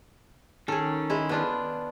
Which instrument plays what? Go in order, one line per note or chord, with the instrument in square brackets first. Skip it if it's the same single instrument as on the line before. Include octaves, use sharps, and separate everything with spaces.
[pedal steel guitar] D#3 C#4 [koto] G#4 A4
[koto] G#3 E4
B3 D4 F4